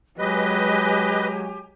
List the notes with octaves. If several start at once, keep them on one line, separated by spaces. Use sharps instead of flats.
F#3 G#3 G4 B4 D#5 G#5